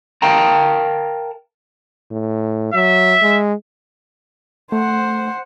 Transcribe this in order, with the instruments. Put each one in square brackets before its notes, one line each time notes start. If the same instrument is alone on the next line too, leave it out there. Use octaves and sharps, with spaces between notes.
[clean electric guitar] A#4 F5 G5 A5 A#5
[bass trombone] A2
[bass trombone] F#3 [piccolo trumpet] E5
[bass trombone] G#3
[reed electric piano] A3 [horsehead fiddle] C5 F#5